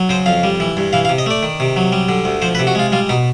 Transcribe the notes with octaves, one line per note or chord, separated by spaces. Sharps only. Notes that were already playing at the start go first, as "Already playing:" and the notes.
Already playing: F#3
C#3 C5
F2 F5
G3
E3
G2
E3 F5
F5
C3
D#5
A3 D5
D#3
C3
F#3
G3
D3
D2
F3 C5
B4
C3
F#4
G#3 F4
G3 F4
B2 D#4